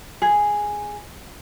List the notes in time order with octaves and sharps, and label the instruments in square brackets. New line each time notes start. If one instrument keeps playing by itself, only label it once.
[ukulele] G#4